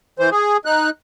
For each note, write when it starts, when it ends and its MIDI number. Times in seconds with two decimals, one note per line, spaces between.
0.19 0.30 52
0.19 0.30 72
0.32 0.57 68
0.65 0.90 63
0.65 0.90 90